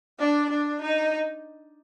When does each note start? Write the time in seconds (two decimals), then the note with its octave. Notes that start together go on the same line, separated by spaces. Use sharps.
0.19 D4
0.50 D4
0.81 D#4